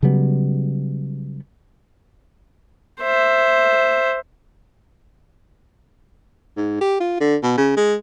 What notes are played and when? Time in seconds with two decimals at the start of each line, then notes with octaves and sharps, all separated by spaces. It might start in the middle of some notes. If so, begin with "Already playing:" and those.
0.03 C#3 F#3 G3 B3
3.01 C5 E5
6.57 G#2
6.81 G4
7.00 F4
7.20 D3
7.43 B2
7.57 C#3
7.77 G#3